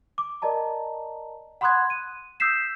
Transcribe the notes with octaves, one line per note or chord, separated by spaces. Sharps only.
D6
A#4 D5 D#5 A5 A#5
F#5 B5 C6 D#6 F#6 G#6
D#7
D#6 E6 G6 B6 C7 E7